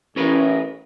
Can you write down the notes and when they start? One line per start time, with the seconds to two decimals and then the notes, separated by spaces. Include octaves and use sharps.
0.16 A1 C#4 A#4 B4